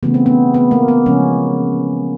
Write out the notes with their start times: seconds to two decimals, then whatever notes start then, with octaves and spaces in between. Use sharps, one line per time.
0.03 C#3 E3 A3 B3
0.14 C4
0.26 B3
0.54 B3
0.71 A#3
0.88 B3
1.06 C#3 F3 G#3 C#4